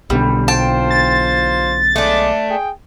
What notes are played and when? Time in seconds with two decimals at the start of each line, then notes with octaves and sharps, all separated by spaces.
0.10 B1 B2 D3 G3
0.48 F4 C5 G5 A5
0.90 A6
1.96 G#3 A3 D4 D5
2.49 G#4 G5